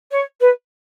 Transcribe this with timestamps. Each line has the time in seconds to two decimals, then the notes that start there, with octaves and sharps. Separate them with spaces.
0.11 C#5
0.40 B4